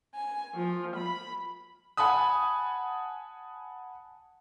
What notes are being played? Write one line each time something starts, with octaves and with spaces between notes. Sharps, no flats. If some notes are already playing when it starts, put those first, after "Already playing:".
G#5
F3
B5
F#5 G#5 A5 B5 D#6